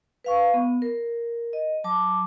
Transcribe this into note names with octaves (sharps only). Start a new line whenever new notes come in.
B4 F5 C#6
B3
A#4
D#5
F#3 A5 D6